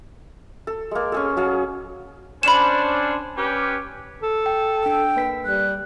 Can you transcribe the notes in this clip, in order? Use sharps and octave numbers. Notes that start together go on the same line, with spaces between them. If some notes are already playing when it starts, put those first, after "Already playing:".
A4
G#3 A#3
C#4 G#4 A4
F#3 G#4 F5
C#4 D4 C5 B5 E7
C#4 G4 B4
A4
G5
D4 G5 E6
A#3 B4 B6
G3 F#6